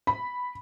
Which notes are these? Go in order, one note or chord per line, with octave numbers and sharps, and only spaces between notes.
B5